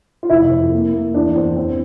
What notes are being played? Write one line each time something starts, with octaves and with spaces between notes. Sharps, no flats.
F4
F1 E4
F2
A#3
A#3
E2 D4
E2 C4
E2 C4